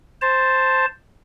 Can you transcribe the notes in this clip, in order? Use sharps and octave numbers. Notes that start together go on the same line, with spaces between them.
C5 A5